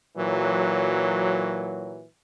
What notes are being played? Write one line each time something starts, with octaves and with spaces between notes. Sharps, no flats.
A#2 E3 F#3